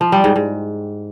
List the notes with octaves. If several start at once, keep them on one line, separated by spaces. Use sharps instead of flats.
F3
G3
G#2
G#2